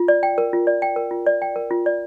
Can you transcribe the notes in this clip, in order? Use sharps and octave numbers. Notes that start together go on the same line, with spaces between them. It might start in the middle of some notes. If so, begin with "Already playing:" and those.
Already playing: F4
D5
G5
A#4
F4
D5
G5
A#4
F4
D5
G5
A#4
F4
D5